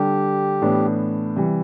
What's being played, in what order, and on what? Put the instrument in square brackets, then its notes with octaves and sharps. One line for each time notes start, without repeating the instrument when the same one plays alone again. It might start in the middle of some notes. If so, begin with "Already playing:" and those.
Already playing: [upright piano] D3 G3 D4 [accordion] G4
[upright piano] A2 E3 B3 D4
C3 E3 G3